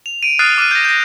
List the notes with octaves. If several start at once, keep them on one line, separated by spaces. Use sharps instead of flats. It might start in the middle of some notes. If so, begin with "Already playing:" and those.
F7
D7 D#7
D#6 F6 F#6 A6 C7 D#7
D6 F6 F#6 D#7
G6 A#6
G6 A#6